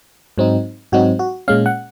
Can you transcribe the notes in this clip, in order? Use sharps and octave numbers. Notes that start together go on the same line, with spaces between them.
G#2 F#3 C4 D#4
G#2 F#3 C4 D#4 F#4
F#4
A#2 G#3 C#4 F5
F#5